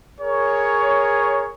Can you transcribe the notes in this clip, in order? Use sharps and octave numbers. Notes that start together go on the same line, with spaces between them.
G#4 A#4 C#5